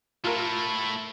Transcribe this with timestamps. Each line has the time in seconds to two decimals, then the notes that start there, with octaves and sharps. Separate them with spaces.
0.24 A3 E4 F4 A#4